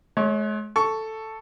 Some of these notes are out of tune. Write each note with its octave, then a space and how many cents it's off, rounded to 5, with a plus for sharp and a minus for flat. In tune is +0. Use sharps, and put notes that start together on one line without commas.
G#3 +40 C#5 +0
A4 +0 C#6 +5